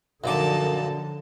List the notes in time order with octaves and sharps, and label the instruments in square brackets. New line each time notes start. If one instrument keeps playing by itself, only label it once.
[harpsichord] F#2 A#2 D6 [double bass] D3 F3 [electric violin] D#4 A5